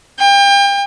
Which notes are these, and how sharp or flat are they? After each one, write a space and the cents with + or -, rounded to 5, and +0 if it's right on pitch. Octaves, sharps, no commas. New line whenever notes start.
G5 +35